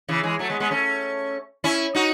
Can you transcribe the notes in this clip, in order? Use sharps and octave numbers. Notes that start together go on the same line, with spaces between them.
C#3 E3
E3 G#3
F#3 A3
G#3 B3
G#3 B3
A3 C#4
C#4 E4
D#4 F#4